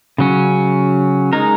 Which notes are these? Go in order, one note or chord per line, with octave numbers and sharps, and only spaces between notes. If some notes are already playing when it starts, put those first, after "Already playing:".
C#3 F#3 C#4
G#3 D#4 A#4